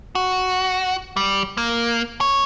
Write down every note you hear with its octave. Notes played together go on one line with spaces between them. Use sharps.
F#4
G3
A#3
C#5